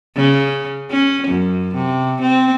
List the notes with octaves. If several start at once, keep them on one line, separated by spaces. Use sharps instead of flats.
C#3
C#4
F#2
C3
C4